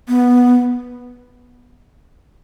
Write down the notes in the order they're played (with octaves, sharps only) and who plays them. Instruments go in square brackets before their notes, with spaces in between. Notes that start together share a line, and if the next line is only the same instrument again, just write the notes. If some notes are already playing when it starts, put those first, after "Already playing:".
[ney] B3